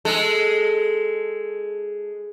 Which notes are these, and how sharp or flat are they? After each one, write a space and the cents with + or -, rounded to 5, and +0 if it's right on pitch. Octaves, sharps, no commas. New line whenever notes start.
G#3 +0 A4 +0